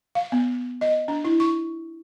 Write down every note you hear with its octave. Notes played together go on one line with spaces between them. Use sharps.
F5
B3
D#5
D4
E4
C#6